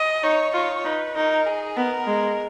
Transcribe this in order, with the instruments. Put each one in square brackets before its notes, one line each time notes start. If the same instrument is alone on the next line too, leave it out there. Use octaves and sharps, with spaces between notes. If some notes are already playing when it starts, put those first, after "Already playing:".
Already playing: [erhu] D#5
[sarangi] D#4 [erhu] C#5
[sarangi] F4 [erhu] C#5
[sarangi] D#4 [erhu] B4
[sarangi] D#4 [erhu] A#4
[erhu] G#4
[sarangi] B3 [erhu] A#4
[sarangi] G#3